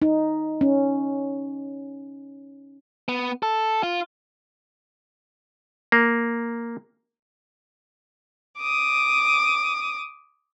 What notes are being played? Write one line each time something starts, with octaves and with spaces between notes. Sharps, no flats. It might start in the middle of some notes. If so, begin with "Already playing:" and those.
D#4
C#4
B3
A4
F4
A#3
D6 D#6